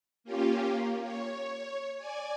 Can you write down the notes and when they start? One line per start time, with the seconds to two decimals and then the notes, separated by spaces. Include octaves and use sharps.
0.24 A#3 C#4 F4 G4
0.69 A#3
1.01 C#5
1.98 D5 G#5